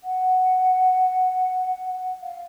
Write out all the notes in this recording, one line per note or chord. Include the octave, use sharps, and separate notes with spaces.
F#5
F5